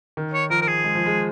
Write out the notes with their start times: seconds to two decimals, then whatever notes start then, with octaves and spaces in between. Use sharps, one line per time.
0.17 D#3
0.33 C#5
0.50 F3 A#4
0.61 A#4
0.67 G#4
0.84 G#3
0.95 F3
1.06 G#3